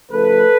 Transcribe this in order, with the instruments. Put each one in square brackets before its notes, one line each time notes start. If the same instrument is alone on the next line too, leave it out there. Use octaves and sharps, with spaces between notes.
[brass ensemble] C#3 F3 A3 A4 B4